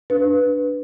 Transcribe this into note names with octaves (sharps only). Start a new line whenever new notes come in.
D4 B4